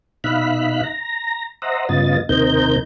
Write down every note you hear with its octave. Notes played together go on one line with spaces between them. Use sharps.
B2 D#4 E5 F5 B5 F#6
A#5
C5 D#5 E5 F#5 A#5
G2 C#3 B3 F4 D#5 A6
D#2 C3 C4 D#4 A#4 G6